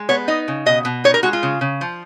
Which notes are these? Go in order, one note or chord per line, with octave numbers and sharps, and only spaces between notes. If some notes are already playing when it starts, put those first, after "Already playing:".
Already playing: G#3
B3 C#5
D#4 D#5
C#3
B2 D#5
B2
D#4 C#5
A#4
G#3 F#4
F4
C#3
C#3
F3